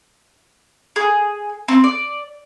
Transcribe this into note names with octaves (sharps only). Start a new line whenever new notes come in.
G#4
C4
D5